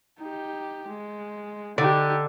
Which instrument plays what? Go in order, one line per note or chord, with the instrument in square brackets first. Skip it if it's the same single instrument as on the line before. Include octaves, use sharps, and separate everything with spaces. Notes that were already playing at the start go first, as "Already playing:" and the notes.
[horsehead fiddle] D#4 G4
G#3
[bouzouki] D3 [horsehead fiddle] D#4 G4